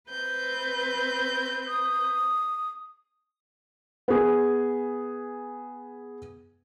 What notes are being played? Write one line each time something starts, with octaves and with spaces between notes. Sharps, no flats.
C4 B4 G6
D#6
B3 G#4